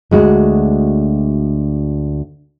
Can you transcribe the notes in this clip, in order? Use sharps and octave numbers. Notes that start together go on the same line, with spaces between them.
D2 G#3 F#4